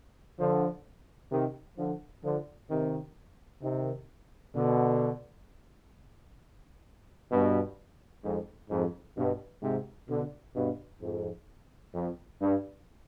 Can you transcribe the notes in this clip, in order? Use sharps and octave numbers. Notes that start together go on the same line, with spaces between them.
D3 F3
C3 D#3
D3 F3
D3 F3
C3 D#3
C3 D#3
B2 D3
G2 B2
F2 G#2
F2 G#2
G2 B2
G#2 C3
B2 D3
G2 B2
F2 G#2
F2
G2